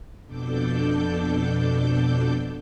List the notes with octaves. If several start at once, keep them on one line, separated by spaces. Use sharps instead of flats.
F2 B2 D4 A4 D6 G6